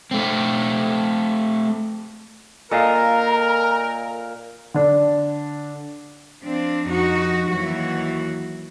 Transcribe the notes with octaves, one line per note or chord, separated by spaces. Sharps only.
A3 C4
A#2 A4 A#4 D#5 F5 A#5
D3 D4
F3 C4 D4
F2 D#4 F#4
D#2 E3 F#3 F#4